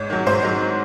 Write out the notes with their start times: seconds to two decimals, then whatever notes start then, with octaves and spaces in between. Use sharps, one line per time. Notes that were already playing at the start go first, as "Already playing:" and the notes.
Already playing: G#2 C#5
0.10 D#3 F#3
0.26 G#2 C5
0.43 D#3 F#3